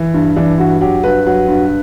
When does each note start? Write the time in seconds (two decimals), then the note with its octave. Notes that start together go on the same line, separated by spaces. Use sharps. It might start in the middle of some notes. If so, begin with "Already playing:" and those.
Already playing: E3
0.14 G2
0.36 E3 D4
0.58 G2 F#4
0.81 F#3 G4
1.04 G2 B4
1.26 F#3
1.48 G2